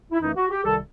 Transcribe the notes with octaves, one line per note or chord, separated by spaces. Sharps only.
E4
F#2 E3 A3 D#4
F#4
G4
C2 C3 D#3 G3 A4